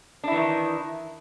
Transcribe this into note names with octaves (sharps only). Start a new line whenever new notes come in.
D#3 E3 D4 E4